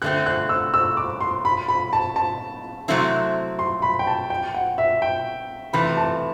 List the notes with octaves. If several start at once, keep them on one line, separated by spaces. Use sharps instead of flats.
D3 A3 C4 F#6
F#6
E6
E6
D6
C6
B5
B5
A5
A5
C3 F#3 A3 C4 E4
C6
B5
G5
A5
G5
F#5
E5
G5
C3 E3 A3 B5
A5